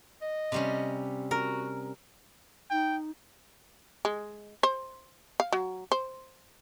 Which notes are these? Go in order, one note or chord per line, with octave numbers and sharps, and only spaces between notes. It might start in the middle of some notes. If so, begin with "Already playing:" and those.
D#5
C3 G3 C#4
F#4 A#4
D#4 G5
G#3
C5
F5
F#3
C5